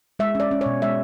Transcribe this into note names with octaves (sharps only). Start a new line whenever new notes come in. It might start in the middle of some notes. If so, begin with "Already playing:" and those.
G#3 E5
C#4 D5
C#4
C#5
B2
G#3 E5